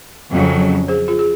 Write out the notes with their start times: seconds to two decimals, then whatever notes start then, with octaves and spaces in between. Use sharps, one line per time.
0.32 F2 C#3 F#3
0.88 G#4 C5
1.08 F4 G#4
1.19 G#4